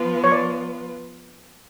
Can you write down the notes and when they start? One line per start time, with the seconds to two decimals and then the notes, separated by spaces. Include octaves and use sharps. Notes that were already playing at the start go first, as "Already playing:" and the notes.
Already playing: F3 B3 F4 B4
0.24 C#5
0.32 D5